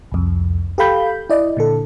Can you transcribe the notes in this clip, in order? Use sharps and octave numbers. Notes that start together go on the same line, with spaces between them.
C2 F2
G4 A4 F5 B5 G6
E4 D5 D#5
A#2 D3 A4